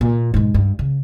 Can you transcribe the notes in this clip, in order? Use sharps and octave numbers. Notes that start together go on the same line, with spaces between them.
A#2
G#2 B2
G2
C#3